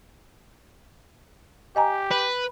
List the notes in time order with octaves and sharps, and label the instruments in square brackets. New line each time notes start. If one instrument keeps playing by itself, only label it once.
[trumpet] G4 [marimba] D#5 G#5 A#5
[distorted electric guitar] B4